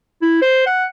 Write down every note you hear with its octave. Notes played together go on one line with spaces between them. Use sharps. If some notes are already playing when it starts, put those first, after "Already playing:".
E4
C5
F#5